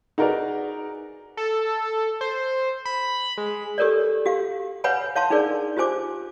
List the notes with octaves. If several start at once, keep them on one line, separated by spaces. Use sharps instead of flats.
D#4 F#4 G#4 A#4 B4 D5
A4
C5
B5
G#3
G4 A4 A#4 C#5 D5
F#4 G4 F5
B4 C#5 F5 F#5 G#5 B5
C#5 F5 A5 C6
D4 D#4 G#4 A#4 D5
F4 G4 C5 G#5 D6